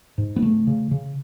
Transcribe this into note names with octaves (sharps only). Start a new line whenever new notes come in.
G#2
B3
C#3 A3
C#3
C#3